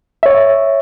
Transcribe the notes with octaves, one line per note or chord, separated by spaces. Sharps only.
C#5 E5